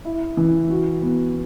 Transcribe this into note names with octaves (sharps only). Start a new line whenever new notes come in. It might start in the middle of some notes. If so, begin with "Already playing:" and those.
E4
E3
F#4
B3